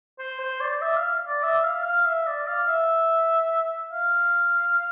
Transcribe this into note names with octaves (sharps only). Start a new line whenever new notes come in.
C5
C5
D5
E5
F5
D5
E5
F5
F5
E5
D5
F5
E5
F5